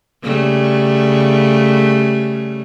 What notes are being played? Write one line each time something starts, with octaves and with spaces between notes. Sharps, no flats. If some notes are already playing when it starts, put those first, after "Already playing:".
C#3 G3 A3